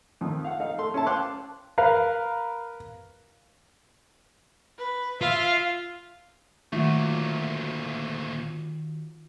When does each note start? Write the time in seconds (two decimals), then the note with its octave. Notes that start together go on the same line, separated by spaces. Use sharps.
0.21 F2 D#3 F3
0.44 F5 F#5
0.60 D#4 F5
0.78 A3 C6
0.94 C#4 E4 A5
1.06 F5 G5 A5 C6 D6 F#6
1.78 A#4 B4 F5
4.78 B4
5.21 F4 E5 F5
6.73 D2 A#2 D#3 F#3 A3 F4 F#4